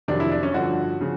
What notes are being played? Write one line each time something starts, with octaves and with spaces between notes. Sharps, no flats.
F2 C3 D#3 F#3 D4
E4
D4
C#4
G2 D3 F3 F#4
C#3 F3